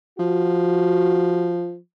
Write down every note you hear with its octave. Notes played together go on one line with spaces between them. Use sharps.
F3 F#4